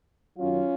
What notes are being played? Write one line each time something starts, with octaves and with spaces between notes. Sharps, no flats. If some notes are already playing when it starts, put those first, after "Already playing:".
F#2 D#3 F#3 C#4 F4